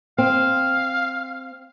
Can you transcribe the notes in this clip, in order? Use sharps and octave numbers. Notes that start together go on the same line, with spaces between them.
C4 F5